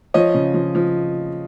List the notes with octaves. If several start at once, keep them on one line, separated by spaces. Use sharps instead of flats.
F3 C#5 D#5
C#3
F3
F3